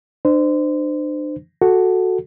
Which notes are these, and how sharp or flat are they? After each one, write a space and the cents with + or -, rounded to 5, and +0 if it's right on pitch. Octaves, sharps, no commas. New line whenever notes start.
D4 +40 C5 -25
F#4 +0 A4 +0